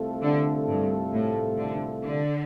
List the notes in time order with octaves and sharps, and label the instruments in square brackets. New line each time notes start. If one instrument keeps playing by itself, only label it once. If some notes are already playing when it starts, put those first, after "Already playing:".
Already playing: [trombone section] C2 C3 A3 F4 A4
[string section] D3
G2
A2
D3
D3